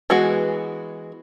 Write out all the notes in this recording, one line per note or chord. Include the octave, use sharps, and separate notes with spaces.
E3 G#3 B3 F#4 G#4